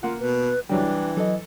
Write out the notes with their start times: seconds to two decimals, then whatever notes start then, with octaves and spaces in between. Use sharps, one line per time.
0.03 A#3 F4 F#5
0.20 B2 B4
0.69 C2 E3 F#3 G3 D4 G5
1.17 F#3 A4 D#5